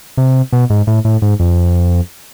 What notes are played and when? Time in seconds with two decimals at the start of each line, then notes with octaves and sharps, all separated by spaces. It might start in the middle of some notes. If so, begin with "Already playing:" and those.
0.17 C3
0.52 B2
0.70 G#2
0.87 A2
1.05 A2
1.22 G#2
1.40 F2